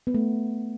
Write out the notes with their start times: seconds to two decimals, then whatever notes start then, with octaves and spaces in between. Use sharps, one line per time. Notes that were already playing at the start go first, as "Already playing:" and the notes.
0.07 B3
0.14 A3